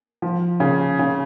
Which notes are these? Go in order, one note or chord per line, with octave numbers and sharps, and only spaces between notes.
F3
C#3
C#3